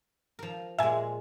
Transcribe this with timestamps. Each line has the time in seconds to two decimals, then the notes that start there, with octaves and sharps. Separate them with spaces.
0.39 F3 A#4
0.79 A#2 G#3 E5 G#5